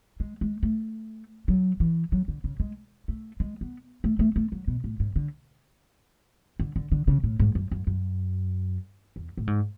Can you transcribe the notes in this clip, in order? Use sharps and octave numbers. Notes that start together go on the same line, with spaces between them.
G#3
G#3
A3
F#3
E3
F#3
D3
C#3
G#3
A3
G#3
B3
A3
A3
A3
F#3
B2
A2
G#2
D3
D3
D3
D3
C#3
A2
G#2
F#2
F#2
F#2
E2
A2
G#2